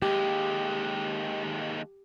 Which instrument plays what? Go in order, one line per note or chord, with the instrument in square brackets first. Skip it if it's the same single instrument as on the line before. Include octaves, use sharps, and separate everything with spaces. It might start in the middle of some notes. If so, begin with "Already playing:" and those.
[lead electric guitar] D#2 G#3 [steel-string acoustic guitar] G4